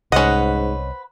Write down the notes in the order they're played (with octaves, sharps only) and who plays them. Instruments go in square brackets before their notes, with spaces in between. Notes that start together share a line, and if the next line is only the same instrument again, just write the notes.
[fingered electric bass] C2 [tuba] G#2 [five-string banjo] C#4 D#5 [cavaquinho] B4 C5 F#5